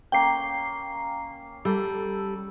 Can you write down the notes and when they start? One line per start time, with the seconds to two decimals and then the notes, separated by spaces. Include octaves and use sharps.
0.12 A#3 C#4 G5 C7
1.65 G3 A4